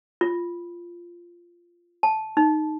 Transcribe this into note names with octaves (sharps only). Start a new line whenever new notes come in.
F4
A5
D#4